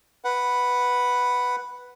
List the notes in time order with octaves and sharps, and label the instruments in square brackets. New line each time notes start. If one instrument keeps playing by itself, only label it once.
[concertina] B4 F#5